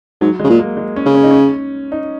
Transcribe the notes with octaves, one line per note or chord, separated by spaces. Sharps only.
G#2 F#3
G#3
C#3
A#2
A#3
G#3
C#4
C#3
C#4
D#4
C#4
D#4